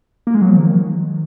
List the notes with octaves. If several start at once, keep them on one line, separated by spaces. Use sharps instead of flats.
A#3
G#3
F#3
F3
D#3